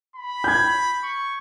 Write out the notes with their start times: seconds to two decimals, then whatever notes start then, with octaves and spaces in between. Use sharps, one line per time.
0.16 B5
0.44 G6 G#6
1.03 C#6